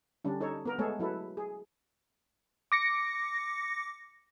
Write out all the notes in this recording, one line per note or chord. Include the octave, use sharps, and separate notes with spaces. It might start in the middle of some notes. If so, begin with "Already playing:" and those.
D3 G3 C#4 D4
D#4 A4 C#5
B3 A#4
G#3 A3 B3 G#4 A4 C#5
F#3 E4 A4 B4
G#4
D6 A#6 C#7